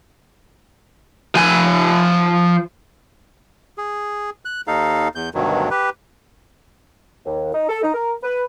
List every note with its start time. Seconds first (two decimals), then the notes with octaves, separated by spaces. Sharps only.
1.35 F3 G#5
3.78 G#4
4.45 F#6
4.67 D#2 D#4 A4 F5
5.15 E2 G6
5.35 D2 G2 B2 D#3 F#3
5.71 G4 B4
7.26 D#2
7.54 D#4
7.69 A4
7.83 D#4
7.94 A#4
8.24 B4